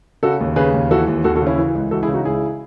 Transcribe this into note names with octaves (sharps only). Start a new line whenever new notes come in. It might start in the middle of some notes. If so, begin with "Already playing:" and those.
C#3 F#4 A4
D#2
C#3 G#4 B4
D#2
E3 F#4 A4
D#2
D#2 F#4 A4
F#4 A4
C#3 C#4 E4
E3
C#2
E3 F#4 A4
E4 G#4
C#3
D#4 F#4
C#2 E4 G#4